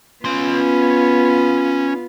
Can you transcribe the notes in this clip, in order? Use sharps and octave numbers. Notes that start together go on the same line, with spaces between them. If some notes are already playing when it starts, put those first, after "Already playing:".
B3 C#4 F4 C6